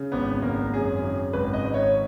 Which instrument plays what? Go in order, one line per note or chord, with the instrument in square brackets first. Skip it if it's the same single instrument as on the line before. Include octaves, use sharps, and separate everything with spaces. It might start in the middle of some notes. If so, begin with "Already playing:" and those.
Already playing: [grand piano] C#3
G#1 B3
G#1 A#3
F#2 G#4
C#3
G#1 B4
D#5
G#1
C#5